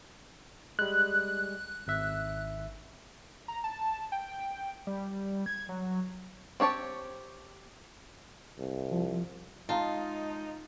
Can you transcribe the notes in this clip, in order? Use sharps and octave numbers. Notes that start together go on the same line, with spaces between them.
G3 G#3 F#6
G#1 E5
A#5
A5
G5
G3
G#6
F#3
C4 G4 C#5 A5
C2
F3
G#3 D#4 F4 F5 A5 A#5